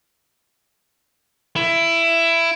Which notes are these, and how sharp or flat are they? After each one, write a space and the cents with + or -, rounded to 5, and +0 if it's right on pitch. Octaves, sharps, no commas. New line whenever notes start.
E4 +15